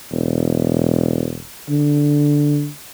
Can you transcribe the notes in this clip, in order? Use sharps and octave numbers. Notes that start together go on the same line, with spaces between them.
E1
D3